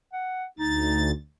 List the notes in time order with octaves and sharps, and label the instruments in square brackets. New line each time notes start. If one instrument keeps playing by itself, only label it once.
[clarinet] F#5
[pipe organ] D2 A6 [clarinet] D#4